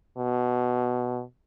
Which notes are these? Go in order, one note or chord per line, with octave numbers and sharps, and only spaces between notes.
B2